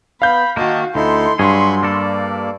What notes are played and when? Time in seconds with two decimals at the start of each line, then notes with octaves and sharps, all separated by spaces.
0.22 B3 F5 B5 G6
0.57 D#3 A#3 F#4 D#5 A5
0.95 D2 D#4 E4 A4 C6
1.39 G2 F#3 G#4 B5 C#6
1.83 A#3 A4 D5